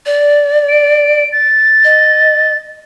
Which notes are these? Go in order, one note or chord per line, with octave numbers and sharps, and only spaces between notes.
D5
D7
A6
D#5